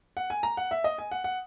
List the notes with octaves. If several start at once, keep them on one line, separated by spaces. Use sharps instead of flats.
F#5
G#5
A#5
F#5
E5
D#5
G#5
F#5
F#5